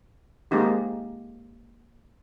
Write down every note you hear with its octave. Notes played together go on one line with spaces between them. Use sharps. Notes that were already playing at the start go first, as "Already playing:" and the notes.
G#3 A#3 C4 D#4 G4